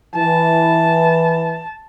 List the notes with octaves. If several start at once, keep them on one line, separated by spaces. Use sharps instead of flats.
E3 A5